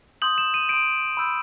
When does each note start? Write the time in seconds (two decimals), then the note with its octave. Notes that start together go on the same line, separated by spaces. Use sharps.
0.22 C6 D#6 G6 F#7
0.38 E7
0.54 D#7
0.69 C6 D#6 G6 D7
1.17 B5 E6 G6